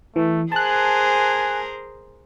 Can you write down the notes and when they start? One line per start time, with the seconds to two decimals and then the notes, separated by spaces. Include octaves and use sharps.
0.16 E3 A3
0.52 G#4 A#4 C5 G#5 A5 F#6